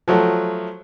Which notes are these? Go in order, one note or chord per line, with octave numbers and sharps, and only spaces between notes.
F3 F#3 A3